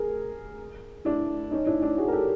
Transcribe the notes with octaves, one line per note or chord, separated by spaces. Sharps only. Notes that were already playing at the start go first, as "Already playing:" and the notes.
Already playing: G#4 A#4
D4 E4
C#4 D#4
D4 E4
D4 E4
F#4 G#4
A#4
G4 A4